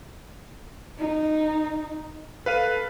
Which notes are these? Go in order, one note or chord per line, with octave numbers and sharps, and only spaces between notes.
D#4
A4 B4 F5 D#7